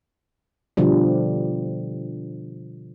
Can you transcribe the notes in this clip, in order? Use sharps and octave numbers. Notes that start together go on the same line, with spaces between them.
B2 D3 F3 G3